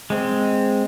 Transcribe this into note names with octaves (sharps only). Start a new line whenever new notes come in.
G#3 C4